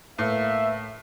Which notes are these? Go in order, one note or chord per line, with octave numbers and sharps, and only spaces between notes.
A2 A#3 B4 E5